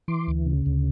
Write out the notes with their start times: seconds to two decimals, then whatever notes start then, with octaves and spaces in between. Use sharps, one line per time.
0.08 E3 C6 D6
0.27 D2
0.46 C#3
0.66 D2